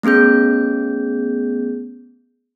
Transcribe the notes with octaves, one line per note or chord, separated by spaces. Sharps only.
A3 B3 C#4 G#4 G6